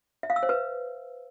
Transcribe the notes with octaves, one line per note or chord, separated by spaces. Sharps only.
E5
F5
E6
C5
B4